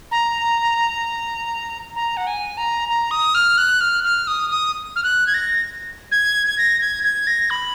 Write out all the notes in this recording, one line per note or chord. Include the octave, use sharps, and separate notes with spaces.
A#5
A#5
F#5
G#5
A#5
A#5
D#6
F6
F#6
F6
F6
D#6
D#6
F6
F#6
G#6
A#6
G#6
G#6
A#6
G#6
G#6
A#6
B5